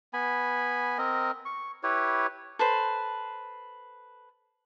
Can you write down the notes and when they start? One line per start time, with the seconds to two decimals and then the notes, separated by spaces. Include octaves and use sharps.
0.13 B3 G#5 B5
0.98 C4 A#4 D#5
1.45 C#6
1.83 E4 G4 B4 C#5
2.59 A4 B4 C5